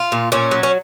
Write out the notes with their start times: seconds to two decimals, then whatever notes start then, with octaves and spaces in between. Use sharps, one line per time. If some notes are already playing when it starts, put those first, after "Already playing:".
Already playing: F4
0.12 A#2
0.32 A#2 C#4
0.51 F#3
0.63 C#4